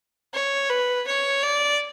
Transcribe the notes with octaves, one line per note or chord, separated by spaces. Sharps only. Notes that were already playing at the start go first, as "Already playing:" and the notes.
C#5
B4
C#5
D5